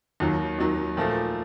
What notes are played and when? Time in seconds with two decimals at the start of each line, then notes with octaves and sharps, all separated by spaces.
0.20 D#2 D#3 F#3
0.59 D#2 D#3 F#3
0.97 A#2 F3 A3